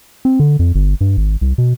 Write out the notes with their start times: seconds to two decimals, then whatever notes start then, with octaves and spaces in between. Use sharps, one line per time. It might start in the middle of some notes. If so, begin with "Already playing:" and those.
0.25 C4
0.40 D3
0.59 F2
0.75 G1
1.01 G2
1.17 G#1
1.41 C2
1.58 B2